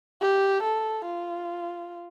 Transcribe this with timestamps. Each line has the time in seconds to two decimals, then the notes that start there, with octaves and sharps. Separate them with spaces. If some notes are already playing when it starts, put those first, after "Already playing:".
0.21 G4
0.63 A4
1.06 F4